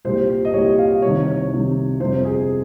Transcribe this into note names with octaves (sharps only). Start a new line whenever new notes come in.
C2 A#2 G3 C5
D#5
C2 A#2 G3 C#5
F5
C2 C3 D#3 C#5
C#5
C2 C3 D#3
G1 F2 C3 C5
G#4